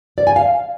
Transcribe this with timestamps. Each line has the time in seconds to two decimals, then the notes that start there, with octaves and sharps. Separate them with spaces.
0.18 D5
0.27 G#5
0.36 F5